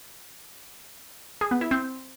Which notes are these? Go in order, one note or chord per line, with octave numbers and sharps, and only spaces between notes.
G#4
B3
E4
C4